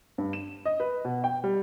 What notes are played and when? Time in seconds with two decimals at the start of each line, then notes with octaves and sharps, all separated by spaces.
0.18 G2
0.33 E7
0.65 D#5
0.80 B4
1.05 B2
1.24 G5
1.44 G3